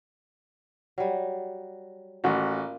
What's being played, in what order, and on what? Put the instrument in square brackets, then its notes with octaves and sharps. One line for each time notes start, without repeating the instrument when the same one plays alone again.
[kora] F#3 G3
[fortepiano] A1 F#4 [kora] A#3 F4